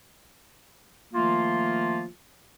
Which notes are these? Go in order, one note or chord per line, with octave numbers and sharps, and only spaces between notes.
D#3 F3 A3 A#3 F4